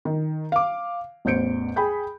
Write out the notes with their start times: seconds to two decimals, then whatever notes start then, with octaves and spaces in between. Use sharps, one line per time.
0.05 D#3
0.52 F5 D6
1.25 A1 E2 C5 G6 C#7 D7
1.76 G#4 G5 B5 G6